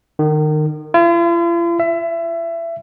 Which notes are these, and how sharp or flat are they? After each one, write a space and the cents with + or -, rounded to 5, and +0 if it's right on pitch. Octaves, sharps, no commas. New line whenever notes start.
D#3 -30
F4 -45
E5 +25